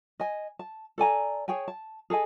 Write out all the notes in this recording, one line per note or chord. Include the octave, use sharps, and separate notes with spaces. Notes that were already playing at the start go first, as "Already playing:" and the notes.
D#5 G#5
A5
A4 D5 G#5 A#5
G#4 C#5 G5 G#5
A5
G#4 A4 D#5 G#5